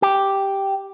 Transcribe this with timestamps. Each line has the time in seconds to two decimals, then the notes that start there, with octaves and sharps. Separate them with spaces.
0.02 G4